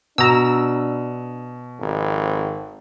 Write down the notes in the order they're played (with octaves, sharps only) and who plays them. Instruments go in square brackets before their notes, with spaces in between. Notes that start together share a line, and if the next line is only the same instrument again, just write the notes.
[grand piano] B2 [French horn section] D4 [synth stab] A#5 E6
[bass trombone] G#1 [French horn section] F2